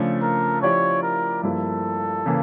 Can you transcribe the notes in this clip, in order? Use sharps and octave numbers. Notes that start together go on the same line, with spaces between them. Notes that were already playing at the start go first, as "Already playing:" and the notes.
Already playing: C#3 F3 A3 D4
A#4
F3 C#4 E4 G4 C#5 D5
A#4
G2 F3 A#3 E4 A4
C#3 E3 A#3